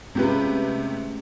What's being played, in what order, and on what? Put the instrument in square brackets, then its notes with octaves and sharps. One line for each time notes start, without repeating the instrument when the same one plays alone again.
[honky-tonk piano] C3 G4 B4 [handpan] G#3 C#4 F4 [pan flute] A3